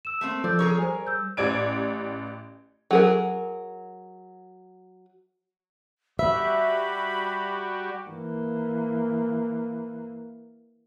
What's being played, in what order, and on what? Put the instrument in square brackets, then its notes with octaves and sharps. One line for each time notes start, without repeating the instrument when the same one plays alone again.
[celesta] E6 E7
[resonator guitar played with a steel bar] A3 A#3 C4
[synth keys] F3 [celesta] A4 E6 G6 [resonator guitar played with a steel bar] D5
[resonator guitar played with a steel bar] G#4 A#4 C#5
[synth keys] G3 [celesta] C5 G#5
[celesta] E6 G6
[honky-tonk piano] A1 G4 D5 G#6 D7
[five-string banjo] F#3 G#4 A#4
[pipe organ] G3 F#4 G4 [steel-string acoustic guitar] E5 [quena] B5
[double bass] E3 A#3